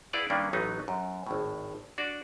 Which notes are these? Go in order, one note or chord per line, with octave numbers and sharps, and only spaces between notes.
E4 G#4 B4 D5 F5 F#5
G2 D#3 A#3 C#4 D4
A1 F#3 B3 D#4
F#2
G#1 A2
D4 F#4 D5